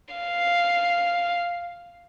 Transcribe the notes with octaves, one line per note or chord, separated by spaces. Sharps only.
F5